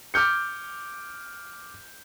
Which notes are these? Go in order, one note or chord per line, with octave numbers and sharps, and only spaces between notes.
D6 F6 G6 C#7